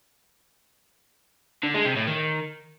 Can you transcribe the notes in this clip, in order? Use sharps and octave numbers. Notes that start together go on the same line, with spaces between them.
D3
G#3
C3
A2
D#3